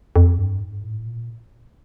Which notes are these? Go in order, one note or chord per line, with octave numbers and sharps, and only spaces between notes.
F2
G2
G#2
A2
A#2